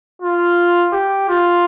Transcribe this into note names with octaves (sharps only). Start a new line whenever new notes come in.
F4
G4
F4